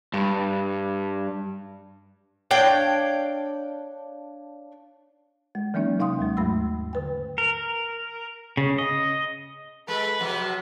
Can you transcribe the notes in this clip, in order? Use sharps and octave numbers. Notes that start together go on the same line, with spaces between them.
G2
D4 C#5 F5 G5
G#3
E3 F#3 A#3 C#4 D#4
C3 D#4 F5 G5 C6 D#6
D#2 F#3 G#3
D#2 G#2 A3 B5 E6
D3 B4 G5
A#4
C#3
D#5
G#3 A4 B4
C3 F3 F#3